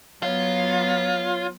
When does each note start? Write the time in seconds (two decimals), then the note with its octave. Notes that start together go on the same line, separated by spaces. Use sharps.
0.23 F#3 B3 F4 C#5